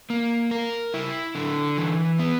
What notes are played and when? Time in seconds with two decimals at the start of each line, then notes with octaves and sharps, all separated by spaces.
0.10 A#3
0.51 A#4
0.94 E4
1.35 D3
1.78 E3
2.19 B3